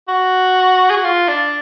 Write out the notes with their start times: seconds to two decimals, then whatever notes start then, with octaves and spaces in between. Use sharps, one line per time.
0.08 F#4
0.90 G#4
0.97 F#4
1.04 F4
1.28 D4